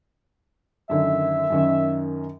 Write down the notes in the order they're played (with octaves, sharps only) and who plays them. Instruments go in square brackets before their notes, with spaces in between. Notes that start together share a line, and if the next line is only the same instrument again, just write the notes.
[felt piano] F#2 D3 D#3 [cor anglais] E5
[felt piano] F#2 D#3 C#4